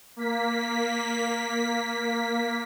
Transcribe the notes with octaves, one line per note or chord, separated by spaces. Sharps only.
A#3 B6